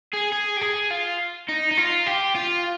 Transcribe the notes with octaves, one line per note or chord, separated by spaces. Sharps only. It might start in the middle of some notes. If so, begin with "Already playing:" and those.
G#4
G#4
G4
G#4
F4
D#4
D#4
F4
G4
F4